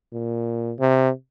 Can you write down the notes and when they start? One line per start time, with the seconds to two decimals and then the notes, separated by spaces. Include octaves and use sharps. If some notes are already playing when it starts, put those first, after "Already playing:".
0.13 A#2
0.79 C3